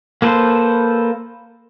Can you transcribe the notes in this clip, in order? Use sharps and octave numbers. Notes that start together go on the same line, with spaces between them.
A#3 A4 B4 C5